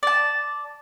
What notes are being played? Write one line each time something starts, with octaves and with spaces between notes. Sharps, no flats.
D5 A5